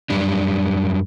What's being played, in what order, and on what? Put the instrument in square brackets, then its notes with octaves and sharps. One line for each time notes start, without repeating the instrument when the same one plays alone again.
[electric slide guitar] F#2 G3 D4